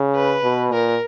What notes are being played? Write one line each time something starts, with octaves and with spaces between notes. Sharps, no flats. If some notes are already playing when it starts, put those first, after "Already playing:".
Already playing: C#3
B4
B2
A#2 A#4